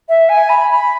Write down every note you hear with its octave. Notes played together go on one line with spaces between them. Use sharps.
E5
G#5
B5
B5